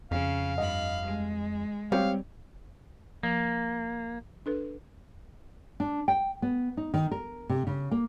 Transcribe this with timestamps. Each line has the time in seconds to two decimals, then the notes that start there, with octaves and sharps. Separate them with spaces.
0.11 F2 C#3 F5
0.58 G2 D#5 B5
1.05 G#3
1.92 G3 C4 G4 C#5 F5
3.23 F3 A#3
4.46 D4 A4 B4
5.80 D4
6.08 G5
6.42 B3
6.77 D#4
6.94 D#3
7.12 A#4
7.49 C3
7.67 C#3
7.91 A#3